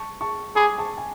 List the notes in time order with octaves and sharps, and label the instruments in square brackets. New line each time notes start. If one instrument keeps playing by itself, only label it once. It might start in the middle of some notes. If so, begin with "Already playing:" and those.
Already playing: [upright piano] A5 C#6
A5 C#6
[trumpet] G#4 [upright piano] B5 D6
[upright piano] A5 C#6
G#5